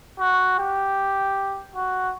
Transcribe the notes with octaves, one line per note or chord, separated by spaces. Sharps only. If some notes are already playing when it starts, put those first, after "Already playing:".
F#4
G4
F#4